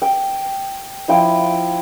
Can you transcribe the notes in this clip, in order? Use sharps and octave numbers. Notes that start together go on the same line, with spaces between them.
G5
F3 E4 F5 G5